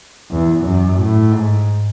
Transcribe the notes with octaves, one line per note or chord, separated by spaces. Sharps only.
E2
F#2
A2
G#2